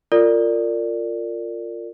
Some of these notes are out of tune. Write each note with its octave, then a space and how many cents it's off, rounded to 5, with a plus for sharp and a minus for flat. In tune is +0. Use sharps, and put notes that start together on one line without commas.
F4 +0 A#4 -30 D5 +0